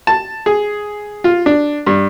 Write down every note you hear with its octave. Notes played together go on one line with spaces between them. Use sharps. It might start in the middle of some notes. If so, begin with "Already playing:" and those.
A5
G#4
F4
D4
G2